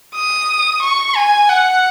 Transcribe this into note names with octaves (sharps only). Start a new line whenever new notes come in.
D#6
C#6
G#5
F#5